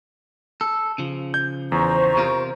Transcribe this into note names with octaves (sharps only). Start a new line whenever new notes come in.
A4
C#3 F3
G6
E2 C5 A#5 C#6
C3 F4 A#4